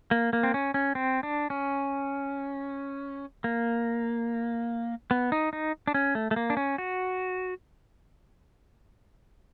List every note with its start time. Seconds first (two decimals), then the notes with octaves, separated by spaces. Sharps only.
0.11 A#3
0.33 A#3
0.43 C4
0.54 C#4
0.74 C#4
0.95 C4
1.23 D4
1.50 C#4
3.44 A#3
5.11 B3
5.32 D#4
5.53 D#4
5.87 D4
5.94 C#4
6.15 A3
6.31 A3
6.36 A#3
6.50 D4
6.57 C#4
6.78 F#4